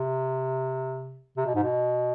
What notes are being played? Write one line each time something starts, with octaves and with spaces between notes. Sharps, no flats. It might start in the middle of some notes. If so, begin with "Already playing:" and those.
Already playing: C3
C3
B2
G#2
B2